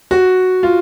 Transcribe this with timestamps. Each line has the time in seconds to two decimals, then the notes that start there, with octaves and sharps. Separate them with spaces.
0.11 F#4
0.63 F4